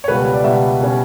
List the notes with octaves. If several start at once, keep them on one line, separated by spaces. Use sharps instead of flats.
C#5
C#2 B2 G3 B4
D5
C#2 B2 G3 E5
B2 G3 C#4